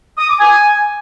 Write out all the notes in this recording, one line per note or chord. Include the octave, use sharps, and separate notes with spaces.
D#6
D6
G#5